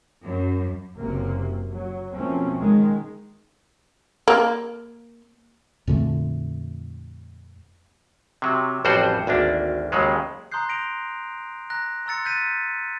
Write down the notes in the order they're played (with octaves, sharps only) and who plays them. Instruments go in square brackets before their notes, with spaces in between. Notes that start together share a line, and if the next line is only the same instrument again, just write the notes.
[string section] F#2
[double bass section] F#1 F#2 C3 A#3
F#3
B2 F3 A3 A#3 C4 C#4
D#3 G#3
[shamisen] A#3
[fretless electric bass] F2 A#2 D3 A3
[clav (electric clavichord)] C3 F#3
A1 F2 G3 F#4 C5 F#5
G#1 D2 A#3 D4
D#2 C#3 F#3 G#3
[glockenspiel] A#5 C6 D#6 F#6 G6 C7
A#6 D7 F7
A#5 F#6 A#6
A#5 C6 E6 A6 C#7
F#6 G6 A6 B6 D#7